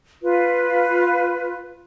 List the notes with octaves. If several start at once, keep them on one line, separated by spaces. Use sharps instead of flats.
F4 B4